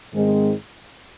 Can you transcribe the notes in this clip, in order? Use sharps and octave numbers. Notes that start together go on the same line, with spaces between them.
G#2 D#3 G#3 C4